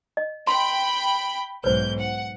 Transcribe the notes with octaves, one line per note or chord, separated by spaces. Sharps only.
D#5
G5 B5 C6
B1 G#2 B4 C5 G6
F#5